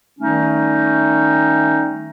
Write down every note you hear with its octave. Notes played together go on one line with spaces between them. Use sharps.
D#3 G3 A3 C#4 D#4